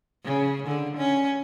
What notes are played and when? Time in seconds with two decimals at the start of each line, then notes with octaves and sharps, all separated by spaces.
0.24 C#3
0.67 D3
0.96 C#4